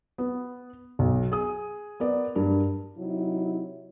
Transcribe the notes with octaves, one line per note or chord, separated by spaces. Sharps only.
B3
B1
G#4 D#6
B3 A#4 D5
G2 A#4
C3 F#3 D#4 E4